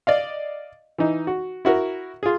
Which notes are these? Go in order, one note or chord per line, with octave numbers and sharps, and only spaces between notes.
D5 D#5 F5
E3 D#4
F#4
E4 F#4 A#4
F4 G#4